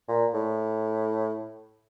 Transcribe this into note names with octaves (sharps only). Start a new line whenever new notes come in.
A#2
A2